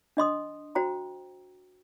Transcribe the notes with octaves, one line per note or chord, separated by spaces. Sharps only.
D4 D#5 C6 D#6
F#4 C5 G5 A#5